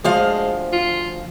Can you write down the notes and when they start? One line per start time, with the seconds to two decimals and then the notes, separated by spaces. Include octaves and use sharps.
0.04 D2 F3 G#3 F5
0.73 F4